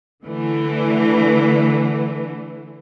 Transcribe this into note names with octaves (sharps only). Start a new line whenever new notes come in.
D3 E3 A3